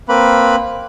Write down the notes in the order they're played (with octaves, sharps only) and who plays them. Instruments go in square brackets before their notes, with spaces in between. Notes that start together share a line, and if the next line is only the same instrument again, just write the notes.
[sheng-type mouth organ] A#3 C4 B4 B5